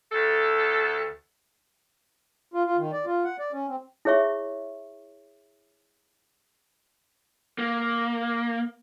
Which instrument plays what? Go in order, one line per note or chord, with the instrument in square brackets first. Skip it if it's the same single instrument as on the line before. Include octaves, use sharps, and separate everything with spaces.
[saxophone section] D2 A4
[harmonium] F4
F4
D#3
D5
F4
F#5
D5
C#4
C4
[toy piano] E4 G#4 C#5 E5 C#6
[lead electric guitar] A#3